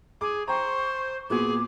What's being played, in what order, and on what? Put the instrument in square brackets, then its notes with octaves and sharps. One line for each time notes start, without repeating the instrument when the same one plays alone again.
[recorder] G#4 [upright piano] D6
[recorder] C5 [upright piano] G5 A#5 [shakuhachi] C#6
[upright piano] A#2 B3 F#4 [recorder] G#4 [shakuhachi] D6